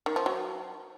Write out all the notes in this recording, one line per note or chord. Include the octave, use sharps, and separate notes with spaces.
D#3
F3
F#3